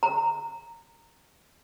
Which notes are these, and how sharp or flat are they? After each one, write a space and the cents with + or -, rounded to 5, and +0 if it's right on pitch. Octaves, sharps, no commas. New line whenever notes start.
A#5 -15